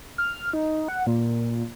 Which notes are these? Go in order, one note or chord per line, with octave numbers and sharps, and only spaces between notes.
F6
D#4
F#5
A#2